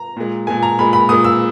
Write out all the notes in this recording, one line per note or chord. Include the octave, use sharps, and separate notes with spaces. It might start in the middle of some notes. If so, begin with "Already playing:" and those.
Already playing: A#5
A#2 G#3
A#2 G#3 G#5
A#5
A#2 G#3 B5
B5
A#2 G#3 D#6
E6